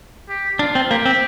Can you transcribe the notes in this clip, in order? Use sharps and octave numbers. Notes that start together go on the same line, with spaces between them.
G4
D4 F4
C4
A#3 G4
C4